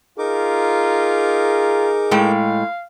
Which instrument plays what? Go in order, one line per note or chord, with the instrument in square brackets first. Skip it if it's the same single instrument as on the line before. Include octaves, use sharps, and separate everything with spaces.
[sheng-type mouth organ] D#4 A#4 D6 [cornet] F4 [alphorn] G#4
[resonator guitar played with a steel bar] A2 G#3 G5 [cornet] F5